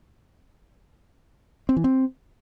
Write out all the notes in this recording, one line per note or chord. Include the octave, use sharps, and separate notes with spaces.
C4
E3
C4